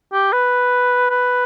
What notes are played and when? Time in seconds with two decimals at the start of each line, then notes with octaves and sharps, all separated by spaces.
0.13 G4
0.32 B4
1.10 B4